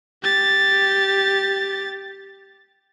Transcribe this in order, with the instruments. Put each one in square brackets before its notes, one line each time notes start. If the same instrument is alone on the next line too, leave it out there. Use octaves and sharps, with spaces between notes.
[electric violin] G4 A6